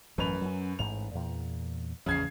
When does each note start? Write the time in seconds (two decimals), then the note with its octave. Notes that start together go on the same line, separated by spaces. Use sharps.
0.18 A1 F#2 E3 F#3 B4 F7
0.41 F#3 C#4
0.79 A1 G#2 F7
1.15 E2 A#2
2.06 A1 E2 C#3 F3 G#6 C7